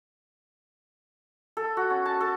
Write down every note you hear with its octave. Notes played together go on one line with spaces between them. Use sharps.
A4
F#4
C#4
A5
A4